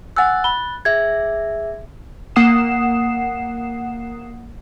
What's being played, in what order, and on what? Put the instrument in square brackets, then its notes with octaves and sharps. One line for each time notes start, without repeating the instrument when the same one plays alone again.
[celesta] F#5 G#5 E6 [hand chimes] F#6 A6
[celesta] B5 G7
[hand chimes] G#4 E5 [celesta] G#6
[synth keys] A#3 F#5 D#6 C7 E7